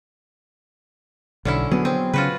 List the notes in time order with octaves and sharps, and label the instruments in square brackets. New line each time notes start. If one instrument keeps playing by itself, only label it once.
[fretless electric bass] B1 [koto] D3 C#4 E4
[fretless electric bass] F#3 B3 [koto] G#4
[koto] C4
[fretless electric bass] C#3 [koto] F4 F#4 B4